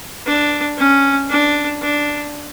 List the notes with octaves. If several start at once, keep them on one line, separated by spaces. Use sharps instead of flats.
D4
C#4
D4
D4